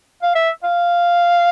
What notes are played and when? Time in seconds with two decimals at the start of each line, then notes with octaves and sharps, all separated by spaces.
0.23 F5
0.36 E5
0.64 F5